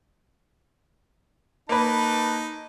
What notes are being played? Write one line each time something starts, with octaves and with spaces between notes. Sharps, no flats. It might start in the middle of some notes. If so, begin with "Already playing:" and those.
A#3 D#4 B4 A5